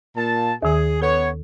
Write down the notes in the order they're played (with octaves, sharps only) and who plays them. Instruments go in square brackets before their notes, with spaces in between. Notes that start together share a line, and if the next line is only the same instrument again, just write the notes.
[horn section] A#2 A5
[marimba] D#2 D#3 [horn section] G#4
[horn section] B3 C#5 [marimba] A4